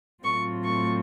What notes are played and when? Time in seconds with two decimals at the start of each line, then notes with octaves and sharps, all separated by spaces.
0.23 A2 F#3 A3 C4 F4 C#6
0.63 C#6